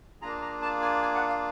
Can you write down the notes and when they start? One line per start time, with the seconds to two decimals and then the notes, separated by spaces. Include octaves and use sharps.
0.21 A#3 D4 F4 G#4 A#5
0.42 A#5
0.62 A5
0.82 G#5
1.02 G#5
1.15 F#5
1.28 F5